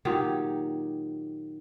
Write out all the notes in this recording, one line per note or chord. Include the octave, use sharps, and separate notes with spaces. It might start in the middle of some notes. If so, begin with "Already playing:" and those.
A#2 D#3 F#3 G4